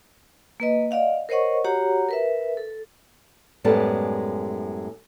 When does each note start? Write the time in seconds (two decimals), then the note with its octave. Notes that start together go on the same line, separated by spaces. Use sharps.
0.60 A#3 B4 D#5
0.91 D5 D#5 F5 F#5
1.29 A#4 C5 C#5 D#5 F#5 C#6
1.64 F#4 G4 C#5 F#5 A#5
2.09 A#4 B4 E5
2.57 A4
3.64 F#2 A2 G3 G#3 B3 A4